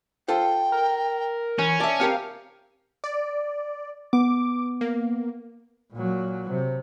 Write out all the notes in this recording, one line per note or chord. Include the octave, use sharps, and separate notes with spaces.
F4 A4 C5 G5
A#4
E3 C#4
D5 E5 A5
C4 G4 A#4 F5
D5
B3 D6
A#3
A#2 F#3
C3